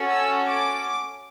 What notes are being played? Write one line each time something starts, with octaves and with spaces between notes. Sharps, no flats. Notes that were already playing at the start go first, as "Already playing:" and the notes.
Already playing: C#4 F#4 A4
E6
D6